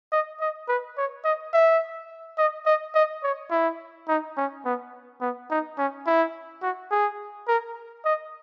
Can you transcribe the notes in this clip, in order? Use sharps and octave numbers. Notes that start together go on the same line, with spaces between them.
D#5
D#5
B4
C#5
D#5
E5
D#5
D#5
D#5
C#5
E4
D#4
C#4
B3
B3
D#4
C#4
E4
F#4
G#4
A#4
D#5